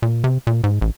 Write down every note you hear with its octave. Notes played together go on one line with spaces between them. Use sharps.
A#2
C3
A#2
G#2
A1